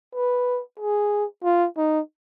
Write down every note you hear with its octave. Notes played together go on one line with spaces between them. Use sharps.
B4
G#4
F4
D#4